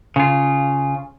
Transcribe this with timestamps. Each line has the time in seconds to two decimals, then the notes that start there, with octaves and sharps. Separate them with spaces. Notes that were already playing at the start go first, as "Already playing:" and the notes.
0.16 C#3 F4